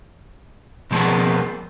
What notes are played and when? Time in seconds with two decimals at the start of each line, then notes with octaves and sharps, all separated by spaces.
0.91 B2 F3 G#3 A#3 B3